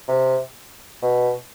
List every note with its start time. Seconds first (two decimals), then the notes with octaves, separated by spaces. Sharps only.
0.08 C3
1.02 B2